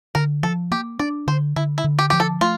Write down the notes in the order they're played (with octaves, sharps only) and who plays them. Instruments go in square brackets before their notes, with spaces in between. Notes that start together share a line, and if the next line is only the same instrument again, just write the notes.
[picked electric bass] D3 [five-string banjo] A#4
[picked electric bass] F3 [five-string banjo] A4
[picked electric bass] A#3 [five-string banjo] G4
[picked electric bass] D4 [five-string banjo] D5
[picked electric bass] D3 [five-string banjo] C5
[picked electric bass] D3 [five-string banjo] E4
[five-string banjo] E4
[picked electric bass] D3
[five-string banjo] G4
[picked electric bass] F3 [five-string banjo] G4
[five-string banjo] A4
[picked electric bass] A3 [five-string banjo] F4